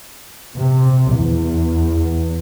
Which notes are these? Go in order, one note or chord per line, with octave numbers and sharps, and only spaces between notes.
C3
E2